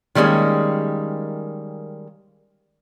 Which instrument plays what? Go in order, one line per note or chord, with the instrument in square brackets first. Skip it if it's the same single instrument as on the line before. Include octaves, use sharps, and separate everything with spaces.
[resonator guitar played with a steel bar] D#3 G3 G#3 A#3 C#4